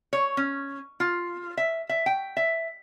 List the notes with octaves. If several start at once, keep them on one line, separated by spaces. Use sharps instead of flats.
C#5
C#4
F4
E5
E5
G5
E5